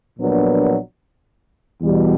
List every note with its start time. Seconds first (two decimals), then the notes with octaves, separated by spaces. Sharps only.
0.19 A#1 A#2 F#3 B3 D4
1.82 E2 B2 G3